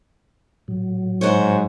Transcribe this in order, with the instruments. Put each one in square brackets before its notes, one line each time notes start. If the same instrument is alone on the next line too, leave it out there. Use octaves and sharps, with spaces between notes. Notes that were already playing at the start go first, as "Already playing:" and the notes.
[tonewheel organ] A2 F#3
[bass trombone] G#2 [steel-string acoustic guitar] F#4 C5 C#5